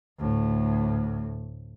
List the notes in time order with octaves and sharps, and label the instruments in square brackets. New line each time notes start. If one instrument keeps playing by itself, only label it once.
[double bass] D2 A2